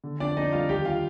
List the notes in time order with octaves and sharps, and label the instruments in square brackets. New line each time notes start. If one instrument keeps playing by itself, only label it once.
[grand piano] D3
F2 D4 D5
F2 D#4 D#5
G3 F4 F5
D#2 G4 G5
F4 F5